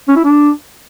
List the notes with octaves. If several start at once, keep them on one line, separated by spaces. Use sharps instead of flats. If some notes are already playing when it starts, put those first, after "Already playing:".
C#4
E4
D4